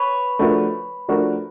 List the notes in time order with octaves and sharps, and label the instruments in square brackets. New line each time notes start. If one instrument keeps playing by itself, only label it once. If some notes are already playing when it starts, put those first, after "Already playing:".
Already playing: [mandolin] B4 C#5
[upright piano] F3 A3 D4 F#4 A#4
F3 A3 D4 F#4 A#4